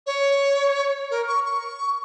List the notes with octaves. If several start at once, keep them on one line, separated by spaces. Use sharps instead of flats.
C#5
A#4
C#6
C#6